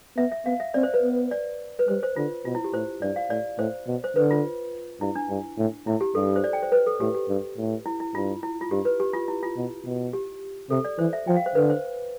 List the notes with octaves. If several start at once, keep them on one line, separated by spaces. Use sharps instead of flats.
B3 E5
E5
B3 F5
E5
C4 D5
C5
B4
B3
D5
B4
G3 C5
C5
D3 F4
B2 F4
E4
G4
A2 C5
G2 D5
F5
A2 D5
A2 C5
B2
C5
D3 B4
F4
G2 E4
D4
G2
A2
A2 E4
G4
G2 A4
C5
D5
G5
C5
B4
A4
A2 G4
G4
G2
A2
E4
E4
G2 F4
E4
F4
G2 G4
B4
G4
F4
E4
F4
B2
B2
G4
C3 A4
D5
E3 C5
E5
F3 G5
F5
C5
D3 B4
C5